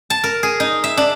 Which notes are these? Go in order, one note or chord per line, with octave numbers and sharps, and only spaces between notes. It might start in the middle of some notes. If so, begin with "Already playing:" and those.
A5
A#4
G#4
D#4
E5
D4